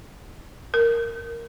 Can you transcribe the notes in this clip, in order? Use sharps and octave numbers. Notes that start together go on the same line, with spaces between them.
A#4